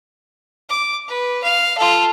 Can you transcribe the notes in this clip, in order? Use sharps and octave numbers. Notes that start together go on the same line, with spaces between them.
D6
B4
F5
F4 A4